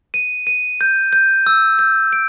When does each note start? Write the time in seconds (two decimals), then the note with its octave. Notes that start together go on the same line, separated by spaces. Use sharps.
0.14 D#7
0.47 D#7
0.81 G6
1.13 G6
1.47 E6
1.79 G6
2.13 D7